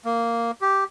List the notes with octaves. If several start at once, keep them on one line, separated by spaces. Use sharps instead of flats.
A#3
G4